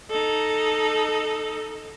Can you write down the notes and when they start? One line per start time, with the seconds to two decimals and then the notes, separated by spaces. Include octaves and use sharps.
0.11 D#4 A4